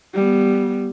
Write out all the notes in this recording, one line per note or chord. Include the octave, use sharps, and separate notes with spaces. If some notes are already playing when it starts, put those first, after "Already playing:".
G3 B3